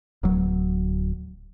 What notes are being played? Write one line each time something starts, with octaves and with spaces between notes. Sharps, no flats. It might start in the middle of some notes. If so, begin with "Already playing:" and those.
D1 F#3